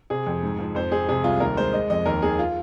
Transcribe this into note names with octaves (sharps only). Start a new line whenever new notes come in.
C3 G#4
F2
G#2
F3
F2 C5
G#3 G#4
C3 G#4
C2 F4
D#2 A#4
G#3 C5
G#3 D#5
F2 D#5
D#2 A#4
D#2 G#4
F4